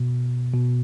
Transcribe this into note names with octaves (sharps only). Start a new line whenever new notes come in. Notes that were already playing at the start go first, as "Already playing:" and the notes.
Already playing: B2
B2